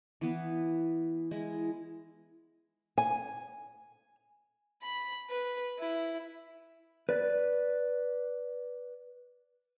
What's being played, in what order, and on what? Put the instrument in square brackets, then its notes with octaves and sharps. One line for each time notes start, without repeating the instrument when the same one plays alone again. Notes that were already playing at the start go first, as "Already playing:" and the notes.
[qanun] E3 B3
G#3 E4
[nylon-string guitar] G#5
[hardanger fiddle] B5
B4
E4
[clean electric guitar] B4 D5